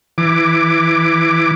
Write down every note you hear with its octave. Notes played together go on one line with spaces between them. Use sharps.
E3 D6